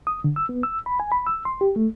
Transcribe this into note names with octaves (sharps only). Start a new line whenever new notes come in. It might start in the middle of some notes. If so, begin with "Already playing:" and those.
D#6
D3
E6
B3
E6
B5
G#5
B5
E6
C6
G4
A3